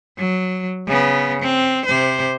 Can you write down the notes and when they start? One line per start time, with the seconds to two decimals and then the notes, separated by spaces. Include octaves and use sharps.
0.18 F#3
0.87 C#3 B3
1.42 C4
1.86 C3 C5